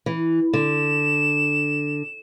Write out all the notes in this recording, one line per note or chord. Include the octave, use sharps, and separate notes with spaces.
E3
D3 E7